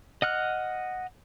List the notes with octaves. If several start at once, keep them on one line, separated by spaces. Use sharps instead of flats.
D#5 F#5 F6 F#6